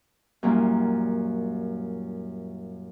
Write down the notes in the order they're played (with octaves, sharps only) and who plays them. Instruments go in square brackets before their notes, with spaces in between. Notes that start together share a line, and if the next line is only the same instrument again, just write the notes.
[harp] F#2 A#2 G3 A#3 C#4 E4